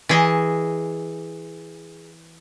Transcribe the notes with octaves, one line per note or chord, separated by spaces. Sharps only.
E3 G#4 D#5